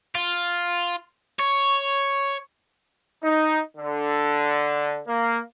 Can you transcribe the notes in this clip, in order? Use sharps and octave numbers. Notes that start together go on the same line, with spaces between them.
F4
C#5
D#4
D3
A#3